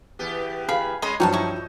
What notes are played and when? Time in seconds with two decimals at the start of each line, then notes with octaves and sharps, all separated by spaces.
0.19 E2 B3 G4
0.69 G#4 F5 B5
1.02 G#3 C#4 D#5 B5 C6
1.20 G2 F3 F#3 D#4 C#5 F#5 A5
1.33 D#4 E4 C#6